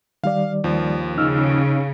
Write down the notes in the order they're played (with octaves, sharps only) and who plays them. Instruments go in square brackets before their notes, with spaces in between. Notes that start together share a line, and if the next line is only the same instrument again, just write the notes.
[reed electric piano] D#3 G3 D5 [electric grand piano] F5
[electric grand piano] D#2 F3
[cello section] C#3 [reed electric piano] D#4 E6 F6